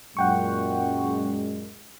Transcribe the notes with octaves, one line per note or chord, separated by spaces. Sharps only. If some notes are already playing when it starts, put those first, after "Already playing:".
F#2 A#2 G#3 F#5 G5 C#6